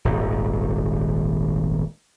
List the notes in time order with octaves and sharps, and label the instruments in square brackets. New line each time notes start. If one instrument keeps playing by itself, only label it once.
[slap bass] D#1 G#1